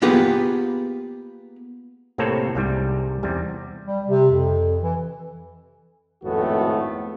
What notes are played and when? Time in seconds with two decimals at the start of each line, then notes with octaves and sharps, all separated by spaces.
0.02 A#3 B3 F4 G4 G#4 B4
2.18 A2 C3 A#3 C4 A4 C#5
2.55 C2 G#2 C3 G3
3.23 E2 C3 G3
3.84 G3
4.07 C3
4.30 F2
4.81 E3
6.23 G#1 F2 A2 A3 B3 F#4